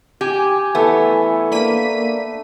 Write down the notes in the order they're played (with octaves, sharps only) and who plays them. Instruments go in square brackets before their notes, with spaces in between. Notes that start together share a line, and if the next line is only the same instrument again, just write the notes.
[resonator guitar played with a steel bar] G4 [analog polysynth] G#5
[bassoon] E3 [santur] A3 [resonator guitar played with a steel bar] B3
[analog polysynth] A#3 B6 D#7 [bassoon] D4